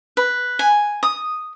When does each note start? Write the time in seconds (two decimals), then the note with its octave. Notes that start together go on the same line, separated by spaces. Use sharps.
0.17 B4
0.59 G#5
1.03 D#6